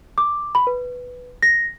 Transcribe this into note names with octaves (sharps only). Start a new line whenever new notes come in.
D6
B5
B4
A#6